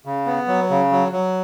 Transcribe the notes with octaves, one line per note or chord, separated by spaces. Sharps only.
C#3
B3
F#3
C#3
F#3
F#3